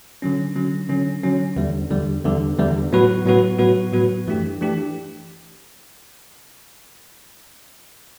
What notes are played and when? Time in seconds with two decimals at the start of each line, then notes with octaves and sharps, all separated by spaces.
0.22 D3 F#3 C#4
0.56 D3 F#3 C#4
0.89 D3 F#3 C#4
1.23 D3 F#3 C#4
1.56 E2 D3 G3
1.90 E2 D3 G3
2.24 E2 D3 G3
2.58 E2 D3 G3
2.92 A2 F#3 B3 F#4 B4
3.25 A2 F#3 B3 F#4 B4
3.59 A2 F#3 B3 F#4 B4
3.93 A2 F#3 B3 F#4 B4
4.27 F#2 E3 A3 D4 G4
4.61 E3 A3 D4 G4